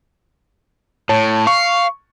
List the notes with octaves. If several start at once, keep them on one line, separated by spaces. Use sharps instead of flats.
A2 C#5 A5
F5 C#6